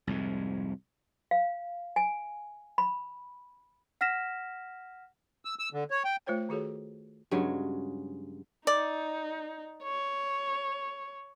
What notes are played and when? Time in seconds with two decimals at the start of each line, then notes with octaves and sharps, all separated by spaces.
0.07 C2 F2 G#2
1.31 F5
1.96 G#5
2.78 B5
4.01 F#5 F6 A#6 B6 E7
5.45 E6
5.59 E6
5.73 D3
5.91 C#5
6.05 G5
6.26 A3 F4 C5 C#5 G5
6.49 D#3 F#4 G#4 A4 C#5
7.31 G2 C#3 F#3 G#3
8.67 D#4 D5
9.84 C#5